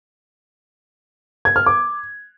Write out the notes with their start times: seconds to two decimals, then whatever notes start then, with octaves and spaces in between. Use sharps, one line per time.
1.45 G#6
1.56 F6
1.66 D6